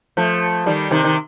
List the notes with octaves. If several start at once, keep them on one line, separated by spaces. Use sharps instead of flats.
F3 A3
D#3 G3
C3 D#3
D#3